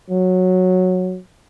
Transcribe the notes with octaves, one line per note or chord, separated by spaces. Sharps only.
F#3